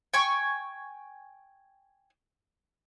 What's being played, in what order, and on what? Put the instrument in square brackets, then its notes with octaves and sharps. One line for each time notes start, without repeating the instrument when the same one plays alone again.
[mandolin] G5 G#5 C#6